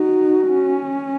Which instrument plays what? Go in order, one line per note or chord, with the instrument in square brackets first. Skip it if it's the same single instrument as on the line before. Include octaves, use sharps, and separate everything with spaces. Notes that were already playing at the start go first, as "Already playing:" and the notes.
Already playing: [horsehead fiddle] D#4 [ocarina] F#4
[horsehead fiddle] C#4